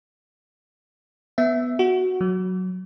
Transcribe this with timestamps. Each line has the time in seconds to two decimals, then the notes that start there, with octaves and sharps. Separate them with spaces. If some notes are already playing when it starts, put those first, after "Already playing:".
1.38 B3 E5
1.79 F#4
2.21 F#3